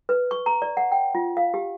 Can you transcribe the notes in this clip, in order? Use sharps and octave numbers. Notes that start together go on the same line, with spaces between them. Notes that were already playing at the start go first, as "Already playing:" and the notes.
B4
C#6
A#5
D5
F#5
G5
F4
F5
G4